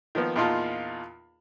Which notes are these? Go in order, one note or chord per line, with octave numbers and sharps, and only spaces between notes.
D#3 F3 A#3 B3
E2 A#2 D#4 F4 A5